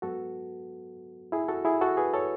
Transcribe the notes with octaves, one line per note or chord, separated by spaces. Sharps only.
G#2 F#3 B3 F#4 A4
E4 G#4
F#4 A4
E4 G#4
F#4 A4
G#4 B4
A4 C#5